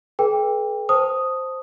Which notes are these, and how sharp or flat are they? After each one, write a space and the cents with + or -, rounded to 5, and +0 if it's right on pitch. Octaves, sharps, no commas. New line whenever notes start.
G#4 +40 B4 -35 G5 +25
C5 +0 A5 +0 D#6 +0